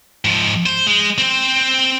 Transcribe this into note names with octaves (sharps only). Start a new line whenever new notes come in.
G#2 F3
C5
G#3
C4 C5